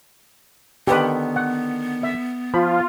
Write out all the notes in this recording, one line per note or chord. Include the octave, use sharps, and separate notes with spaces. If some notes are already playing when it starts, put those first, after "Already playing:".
D3 D#3 B3 G4 B4
F#5
E5
F3 F4 B5